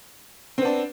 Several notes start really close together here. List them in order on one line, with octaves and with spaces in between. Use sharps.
C4 B3 D4